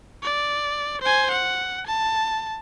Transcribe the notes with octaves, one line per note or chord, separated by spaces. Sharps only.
D5
C5 G#5
F#5
A5